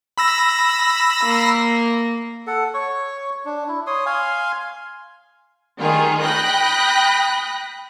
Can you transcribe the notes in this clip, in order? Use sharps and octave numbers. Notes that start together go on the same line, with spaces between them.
B5 E6 A#6
A#3
A4 F#5
C#5 C#6
D4
E4
C#5 C6 D#6
F5 G#5 C6
D#3 G3 F4 G#4
G5 B5 D#6 F#6 A#6 B6